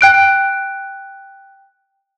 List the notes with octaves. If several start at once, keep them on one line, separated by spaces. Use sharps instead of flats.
G5 F#6 D7